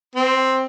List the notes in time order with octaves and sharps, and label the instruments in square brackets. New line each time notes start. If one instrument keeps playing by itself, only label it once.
[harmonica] C4